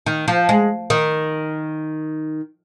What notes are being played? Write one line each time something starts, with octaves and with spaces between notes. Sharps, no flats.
D#3
F3
G#3
D#3